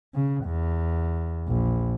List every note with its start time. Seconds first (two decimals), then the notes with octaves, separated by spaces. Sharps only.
0.14 C#3
0.45 E2
1.47 A#1